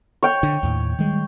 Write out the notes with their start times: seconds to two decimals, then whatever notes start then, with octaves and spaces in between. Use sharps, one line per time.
0.23 C#5 G5
0.43 D3
0.63 D#2 A2
0.99 D#3 G3 G#3